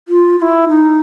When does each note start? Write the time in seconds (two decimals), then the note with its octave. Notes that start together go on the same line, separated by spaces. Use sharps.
0.08 F4
0.39 F4
0.42 E4
0.68 D#4